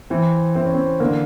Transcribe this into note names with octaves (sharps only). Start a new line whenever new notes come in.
E3 C4
E3 C4
C#4
C4
D3 A#3